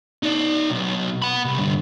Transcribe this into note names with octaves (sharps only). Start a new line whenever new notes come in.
D#4 D5
B1
F#5 B5
C2
G2 D3